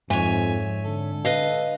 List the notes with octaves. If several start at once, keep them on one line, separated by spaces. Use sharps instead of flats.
F2 G#2 C#5 E5 G#5
D3 A4
B4 D#5 F5